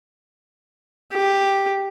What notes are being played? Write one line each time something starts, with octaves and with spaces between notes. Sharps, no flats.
G4